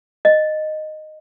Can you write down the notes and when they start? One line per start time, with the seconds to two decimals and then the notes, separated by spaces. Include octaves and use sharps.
0.25 D#5